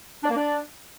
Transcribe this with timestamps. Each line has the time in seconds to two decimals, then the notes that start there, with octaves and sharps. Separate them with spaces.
0.24 D4
0.30 A#3
0.36 D4